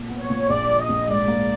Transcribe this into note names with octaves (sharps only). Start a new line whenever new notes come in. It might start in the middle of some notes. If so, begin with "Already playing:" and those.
Already playing: A#2
B3
C#5
A#2
A#1 D5
F3
D#5
A#1
G#2 D5
A#3